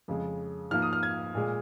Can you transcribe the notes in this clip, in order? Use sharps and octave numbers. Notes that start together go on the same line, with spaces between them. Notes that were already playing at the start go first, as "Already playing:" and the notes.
F2 C#3 G#3
G#2 F3 A#3 F6
D#6
F6
G#6
A#2 G#3